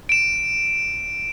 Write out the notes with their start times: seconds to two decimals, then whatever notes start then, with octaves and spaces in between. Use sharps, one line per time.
0.09 D7 E7